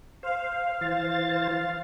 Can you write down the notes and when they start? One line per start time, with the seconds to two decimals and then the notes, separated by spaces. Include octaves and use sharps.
0.23 C5 F5
0.81 E3 C5 A6